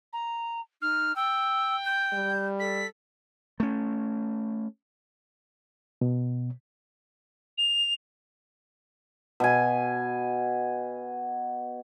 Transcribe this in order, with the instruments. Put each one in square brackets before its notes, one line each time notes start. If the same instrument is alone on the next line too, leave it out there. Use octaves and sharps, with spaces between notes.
[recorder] A#5
[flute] D#4 [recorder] F6
[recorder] G5 [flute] E6
[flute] G6
[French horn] G3
[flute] A4 [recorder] B6
[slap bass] A3 C#4
[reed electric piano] B2
[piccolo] F7
[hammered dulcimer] B2 G#5